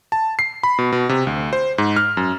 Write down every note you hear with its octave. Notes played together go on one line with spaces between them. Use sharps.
A5
C7
B5
B2
B2
C3
D2
C5
G#2
F6
F#2